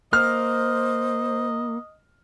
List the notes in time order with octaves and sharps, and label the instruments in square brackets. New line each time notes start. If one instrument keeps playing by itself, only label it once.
[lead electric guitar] A#3 [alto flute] C5 [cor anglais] D#5 [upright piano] F6